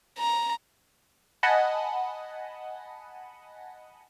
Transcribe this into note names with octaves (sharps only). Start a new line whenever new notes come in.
A#5
D#5 F#5 G#5 A5 B5